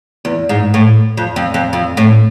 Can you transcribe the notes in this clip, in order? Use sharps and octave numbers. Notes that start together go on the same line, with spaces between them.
E2
G#2
A2
F2
F2
F2
F2
A2